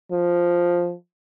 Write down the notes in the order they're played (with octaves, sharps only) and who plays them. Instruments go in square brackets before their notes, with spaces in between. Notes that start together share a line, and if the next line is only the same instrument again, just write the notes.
[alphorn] F3